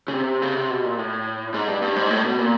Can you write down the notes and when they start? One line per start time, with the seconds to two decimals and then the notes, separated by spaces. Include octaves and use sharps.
0.08 C#3
0.14 C3
0.42 C#3
0.56 C3
0.70 B2
0.84 A#2
0.98 A2
1.54 G#2
1.68 G2
1.82 G2
1.96 G#2
2.10 A2
2.24 B2
2.39 A#2